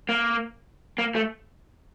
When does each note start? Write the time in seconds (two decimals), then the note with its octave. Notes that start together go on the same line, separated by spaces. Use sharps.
0.09 A#3
0.98 A#3
1.15 A3